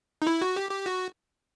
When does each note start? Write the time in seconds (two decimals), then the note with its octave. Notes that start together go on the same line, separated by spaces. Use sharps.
0.22 D#4
0.27 E4
0.42 F#4
0.56 G4
0.71 G4
0.86 F#4